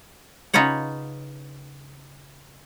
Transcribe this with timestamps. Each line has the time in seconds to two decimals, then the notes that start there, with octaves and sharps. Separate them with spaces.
0.54 C#3 D#4 F4 B4 C#5 F#5